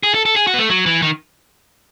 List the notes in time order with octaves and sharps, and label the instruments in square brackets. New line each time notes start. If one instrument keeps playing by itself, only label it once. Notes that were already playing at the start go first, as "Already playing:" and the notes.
[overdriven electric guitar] G#4
A4
A4
G#4
F#4
B3
A3
F#3
E3
D#3